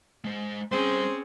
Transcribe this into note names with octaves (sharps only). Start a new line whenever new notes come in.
G#3 C5
G3 C4 C#4 G#4 C5 C6